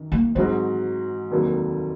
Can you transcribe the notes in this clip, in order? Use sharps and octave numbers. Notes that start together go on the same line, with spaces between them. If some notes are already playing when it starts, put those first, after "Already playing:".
Already playing: F#2 D#3
A#3
G#2 F#3 G#3 C4 F#4 C5
F1 D#2 D#3 F#3 A#3